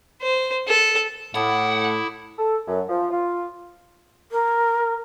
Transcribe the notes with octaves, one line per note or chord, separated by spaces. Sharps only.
C5
A4
A2 E4 A4 F#5 D6 D#6
A4
F#2
F3
F4
A#4